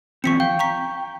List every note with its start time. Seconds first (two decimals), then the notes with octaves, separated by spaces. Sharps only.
0.24 E3 F3 C4 C#6 B6 C#7
0.40 F5 G5
0.59 A#5 C#6 B6